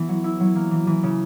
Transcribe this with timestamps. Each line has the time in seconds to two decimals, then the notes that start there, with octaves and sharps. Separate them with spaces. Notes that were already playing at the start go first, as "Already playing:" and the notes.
Already playing: E3 B3
0.09 F#3
0.24 E4
0.40 F#3
0.55 A#3
0.71 E3
0.87 E3
1.03 C#3